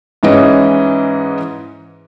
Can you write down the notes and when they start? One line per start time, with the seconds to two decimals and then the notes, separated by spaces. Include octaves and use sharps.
0.23 G#2 E3 C#4 D#5